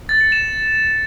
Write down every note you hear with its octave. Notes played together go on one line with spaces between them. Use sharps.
A6
C#7
E7